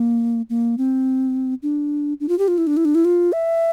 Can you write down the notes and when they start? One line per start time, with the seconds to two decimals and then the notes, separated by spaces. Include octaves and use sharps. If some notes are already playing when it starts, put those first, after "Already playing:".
Already playing: A#3
0.50 A#3
0.78 C4
1.63 D4
2.20 D4
2.29 F4
2.39 G4
2.48 F4
2.58 E4
2.67 D4
2.77 E4
2.85 D4
2.95 E4
3.05 F4
3.32 E5